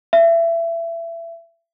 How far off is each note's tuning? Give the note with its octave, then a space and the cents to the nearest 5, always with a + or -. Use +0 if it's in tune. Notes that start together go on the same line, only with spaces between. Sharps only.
E5 +25